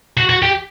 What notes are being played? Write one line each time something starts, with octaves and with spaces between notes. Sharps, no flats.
F#4
F#4
G4